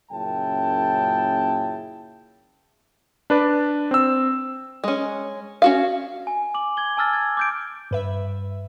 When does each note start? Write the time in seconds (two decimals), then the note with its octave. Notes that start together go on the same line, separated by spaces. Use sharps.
0.11 F#2 A#2 C#3 E4 G5 A5
3.30 D4 B4 D5
3.91 C4 E6
4.84 G#3 C#4
5.62 C#4 F#4 F5
6.27 G#5
6.54 D6 F#7
6.77 G#6 G7
6.97 G#5 A5 E6 F6 A6
7.13 G#6
7.37 D6 G6 D7
7.91 G2 B4 E5